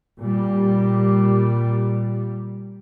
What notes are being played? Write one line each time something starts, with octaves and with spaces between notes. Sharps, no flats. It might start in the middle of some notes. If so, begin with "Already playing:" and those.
A#2 G3